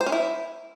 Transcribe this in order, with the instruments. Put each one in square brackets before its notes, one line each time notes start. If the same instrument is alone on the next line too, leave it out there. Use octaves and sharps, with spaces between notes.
[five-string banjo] C5
C#4
E4